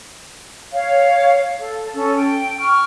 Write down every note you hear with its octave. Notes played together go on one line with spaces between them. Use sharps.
C#5 F5
A4
C#4 A4
G5
C#6 F6